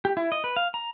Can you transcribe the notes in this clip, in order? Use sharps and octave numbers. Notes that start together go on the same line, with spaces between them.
G4
E4
D#5
B4
F5
A#5